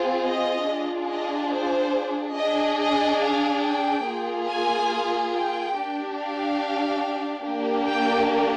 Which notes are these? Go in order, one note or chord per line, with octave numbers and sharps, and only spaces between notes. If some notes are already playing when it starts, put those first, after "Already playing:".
Already playing: C4 F4 G#4
D#5
D4 F4 G#4
D#5
C5
D4 G#4 D#5
D#5
F5
G5
A#3 F4 G#4
G#5
G5
D4 G4
F5
A#3 D4 G4
G5